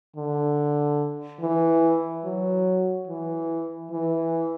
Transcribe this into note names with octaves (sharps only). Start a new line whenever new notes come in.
D3
E3
F#3
E3
E3